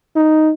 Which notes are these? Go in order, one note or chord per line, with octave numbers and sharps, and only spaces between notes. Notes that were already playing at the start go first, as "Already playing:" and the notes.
D#4